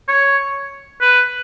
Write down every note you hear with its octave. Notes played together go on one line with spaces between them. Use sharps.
C#5
B4